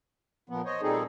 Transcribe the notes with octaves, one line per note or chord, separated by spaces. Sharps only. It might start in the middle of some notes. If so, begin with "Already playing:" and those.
A#2 F3 B3
C5 C#5 D#5
A#2 G3 C4 D#4 G#4 A4